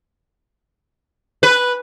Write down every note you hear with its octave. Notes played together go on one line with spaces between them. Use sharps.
B4